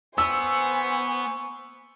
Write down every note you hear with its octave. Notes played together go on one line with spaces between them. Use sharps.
B3 C5 G#5 C#6 E6